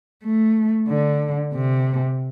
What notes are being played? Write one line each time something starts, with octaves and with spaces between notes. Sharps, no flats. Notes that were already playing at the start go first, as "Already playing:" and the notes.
A3
D3
C3